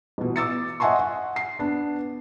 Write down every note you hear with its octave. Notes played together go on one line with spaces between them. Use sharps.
A1 B2
D6 E6 A6 C#7
D#5 E5 F#5 G#5 C6 C#6
F#5
C7
B3 D4